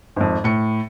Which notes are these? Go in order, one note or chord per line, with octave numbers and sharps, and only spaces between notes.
G#1 F2
A2 C#7